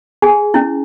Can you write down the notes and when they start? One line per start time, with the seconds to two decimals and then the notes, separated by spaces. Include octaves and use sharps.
0.22 G#4 G#5
0.54 C#4 E4